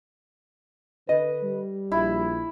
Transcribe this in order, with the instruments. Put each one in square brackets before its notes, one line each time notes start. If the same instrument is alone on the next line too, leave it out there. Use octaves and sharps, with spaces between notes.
[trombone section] D3 B4 [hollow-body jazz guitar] D#5
[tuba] G3
[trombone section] A#1 [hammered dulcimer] E4